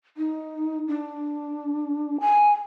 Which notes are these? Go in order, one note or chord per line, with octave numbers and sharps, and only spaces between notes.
D#4
D4
G#5